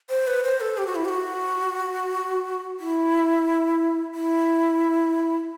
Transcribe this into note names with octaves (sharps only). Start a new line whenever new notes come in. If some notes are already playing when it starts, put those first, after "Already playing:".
C5
B4
C5
A4
G4
F#4
E4
G4
F#4
E4
E4